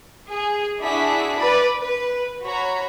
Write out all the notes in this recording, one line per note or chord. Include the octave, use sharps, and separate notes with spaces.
G#4
D4 E4 F#4 G#4 B6
B4 D5 B5
B4
F#4 C#5 A#5 B5